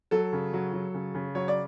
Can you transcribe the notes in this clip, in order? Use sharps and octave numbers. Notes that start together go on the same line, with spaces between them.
F#3 A4
C#3
F#3
F#3
C#3
C#3
F#3 C#5
D5